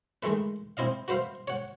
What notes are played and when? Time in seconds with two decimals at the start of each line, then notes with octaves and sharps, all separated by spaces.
0.23 D#3 G#3 A3 B4
0.77 C4 E4 D#5 F5
1.08 F#4 B4 C5 E5 F5
1.48 C#5 F#5